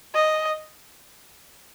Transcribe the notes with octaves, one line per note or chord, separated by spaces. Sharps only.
D#5